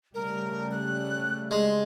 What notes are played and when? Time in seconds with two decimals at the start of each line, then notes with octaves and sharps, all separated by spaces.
0.14 C#3 G3 A3 A#4
0.71 F#6
1.51 G#3 C6